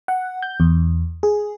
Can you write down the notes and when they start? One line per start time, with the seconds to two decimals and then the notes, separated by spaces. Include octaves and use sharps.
0.08 F#5
0.42 G6
0.60 E2
1.23 G#4